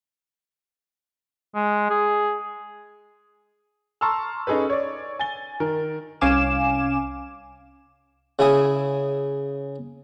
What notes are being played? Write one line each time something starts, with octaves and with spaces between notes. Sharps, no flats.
G#3
G#4
A5 A#5 C6 C#6 E6 F6
C#4 D#4 G#4 A4 B4
C#5 D5
G#5 A6 G7
D#3 A#4
C2 C#4 F5 G#5 D6 E7
C#3 E4 G#5 D#6